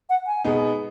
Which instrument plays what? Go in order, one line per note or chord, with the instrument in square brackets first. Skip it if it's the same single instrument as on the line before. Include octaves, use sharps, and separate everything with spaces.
[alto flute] F#5
G#5
[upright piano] B2 G#3 B3 D#4